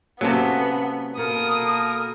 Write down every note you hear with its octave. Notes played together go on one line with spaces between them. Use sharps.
C3 F#3 A#3 B3 C#4 A4
B2 A#3 A4 A#4 D#6